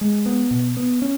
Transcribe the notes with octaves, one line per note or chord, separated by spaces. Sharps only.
G#3
B3
B2
B3
C#4